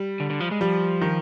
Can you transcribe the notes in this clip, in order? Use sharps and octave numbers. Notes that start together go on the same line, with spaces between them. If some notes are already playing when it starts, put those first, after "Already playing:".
Already playing: G3
D3
D3
F3
G#3
F3 G3
D#3